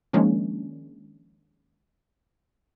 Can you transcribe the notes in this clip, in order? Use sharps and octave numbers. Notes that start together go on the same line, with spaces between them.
D#3 F3 G#3 A#3 C#4 D4